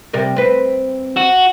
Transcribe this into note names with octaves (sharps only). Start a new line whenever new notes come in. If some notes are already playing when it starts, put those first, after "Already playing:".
C3 G3 A#4
C4 B4
F#4